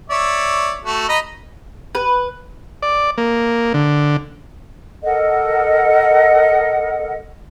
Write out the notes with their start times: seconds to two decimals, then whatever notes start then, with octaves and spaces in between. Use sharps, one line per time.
0.10 C#5 D5 E5
0.85 A3 F#4
1.09 D#5 A#5 B5
1.95 B4
2.83 D5
3.18 A#3
3.74 D3
5.03 A4 A#4 D#5 F#5